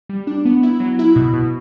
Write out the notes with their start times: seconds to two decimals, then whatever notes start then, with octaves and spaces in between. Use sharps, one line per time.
0.09 G3
0.27 D4
0.45 B3
0.63 E4
0.80 F#3
0.99 E4
1.16 B2
1.33 B2